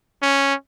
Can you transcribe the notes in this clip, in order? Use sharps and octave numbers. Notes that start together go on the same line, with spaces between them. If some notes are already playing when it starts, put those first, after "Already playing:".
C#4